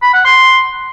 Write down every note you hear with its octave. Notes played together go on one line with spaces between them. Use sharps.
B5
F#5
C6